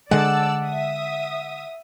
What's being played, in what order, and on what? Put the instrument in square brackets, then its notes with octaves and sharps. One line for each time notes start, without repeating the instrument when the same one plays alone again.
[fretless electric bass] D3 G#3 [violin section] D5 A5 E6 [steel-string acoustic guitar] F#5
[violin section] E5 D#6